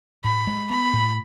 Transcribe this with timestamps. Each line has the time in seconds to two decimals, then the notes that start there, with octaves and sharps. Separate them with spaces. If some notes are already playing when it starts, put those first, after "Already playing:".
0.24 A2 B5
0.47 G#3
0.70 B3 B5
0.93 A2